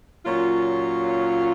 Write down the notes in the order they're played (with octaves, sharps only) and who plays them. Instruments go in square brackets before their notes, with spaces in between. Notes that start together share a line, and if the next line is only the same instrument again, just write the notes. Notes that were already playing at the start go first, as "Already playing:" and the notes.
[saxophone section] A#2 F#3 C#4 F4